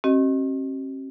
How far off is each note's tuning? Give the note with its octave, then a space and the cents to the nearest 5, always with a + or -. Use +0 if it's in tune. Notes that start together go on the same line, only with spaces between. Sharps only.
C4 +45 F#4 +45 D#5 +0